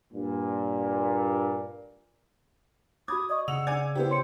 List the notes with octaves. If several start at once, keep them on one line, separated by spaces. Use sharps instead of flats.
G2 A#2
F#4 B5 D6 D#6 G#6
D5 D#5 C#6 D#6
C#3 F#5 E6 F7
D5 G#5 D6 G#6
B3 E4 G4 C5
C#5 C6 C#7